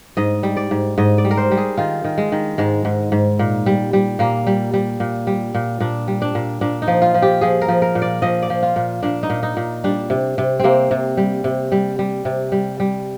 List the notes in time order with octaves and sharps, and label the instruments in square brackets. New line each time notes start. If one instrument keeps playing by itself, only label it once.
[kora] G#2 D#5
G3
D5
G#2
G#2 D#5
D5
G3
A#4
C5
G3
G#4
D#3 F4
D#3
G#3
D#3
G#2 G#3
G#2
G#2
A#2
G3
G3
A#2 A#3
G3
G3
A#2
G3
A#2
A#2 D4
G3
D4
A#2
A#2 D4
D#4
F3
F4
F3
G4
F3 G#4
A#4
F3
A#4
A#2
D5
F3 D#5
D5
F3
F4
A#2
A#2 D4
D#4
A#2
D#4
A#2
G3 D4
C3
C3
C3 A#3 C4
C3
G3
C3
G3
G3
C3
G3
G3